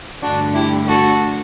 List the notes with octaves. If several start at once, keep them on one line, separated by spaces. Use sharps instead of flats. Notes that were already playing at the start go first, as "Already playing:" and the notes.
G2 D3 A3 D4 F#4
E4 G4
F#4 A4